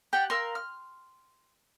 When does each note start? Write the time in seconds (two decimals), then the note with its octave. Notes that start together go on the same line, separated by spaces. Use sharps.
0.13 G4 F#5 G5 A5
0.30 A#4 F5 C6 E6
0.55 F6